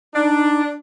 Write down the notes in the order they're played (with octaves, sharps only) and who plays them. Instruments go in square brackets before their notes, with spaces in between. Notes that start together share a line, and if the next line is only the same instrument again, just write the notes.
[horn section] D4 [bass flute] D#4